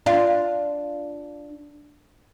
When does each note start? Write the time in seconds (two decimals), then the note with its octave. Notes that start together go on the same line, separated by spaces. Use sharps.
0.06 D4 F4